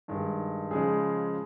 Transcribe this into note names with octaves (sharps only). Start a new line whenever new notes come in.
G2 D#3 G#3
C#3 F3 G#3 G#4